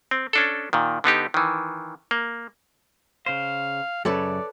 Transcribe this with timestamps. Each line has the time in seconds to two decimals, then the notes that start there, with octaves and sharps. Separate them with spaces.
0.11 C4
0.33 C#4 D4 A4
0.73 A#2 D#3
1.04 D3 B3 D#4 G4
1.34 D#3 E3
2.11 A#3
3.26 C#3 C5 F5
4.05 F#2 C#3 A4 B4 C#5 D5